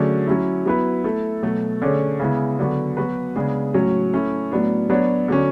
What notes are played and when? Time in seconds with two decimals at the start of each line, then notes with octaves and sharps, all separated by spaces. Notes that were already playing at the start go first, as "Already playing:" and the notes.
Already playing: D3 F#3 A3 C#4 G#4
0.27 F#3 C#4 E4
0.66 F#3 B3 E4 B4
1.04 A3 E4 A4
1.43 B2 F#3 A3
1.82 D3 A3 C#4 G#4 C#5
2.20 C#3 G#3 B3 E4
2.59 D3 F#3 B3 F#4
2.97 F#3 B3 F#4 B4
3.36 C#3 G#3 B3 D4 G#4
3.74 A2 F#3 C#4
4.13 A3 C#4 E4
4.52 A2 F#3 B3 D4
4.90 F#3 B3 D4 F#4 C#5
5.28 D3 F#3 C#4